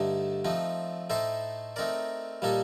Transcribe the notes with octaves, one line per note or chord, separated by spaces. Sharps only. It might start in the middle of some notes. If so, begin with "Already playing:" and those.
Already playing: G2 D3 A3 D#4
F3 A3 C4 D#4
A2 A3 D#4 A4 C5
A3 C4 D#4 A#4 D5
A#2 G3 A#3 D#4 A4